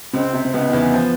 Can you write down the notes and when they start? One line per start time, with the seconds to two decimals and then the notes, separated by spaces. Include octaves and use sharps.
0.13 C#2 C#3 C4
0.33 C3
0.45 C4
0.53 C#2 C#3 B3
0.69 D#3
0.73 E2 E3
0.94 F3